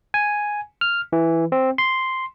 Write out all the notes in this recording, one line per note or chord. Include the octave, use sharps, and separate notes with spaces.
G#5
F6
E3
C4
C6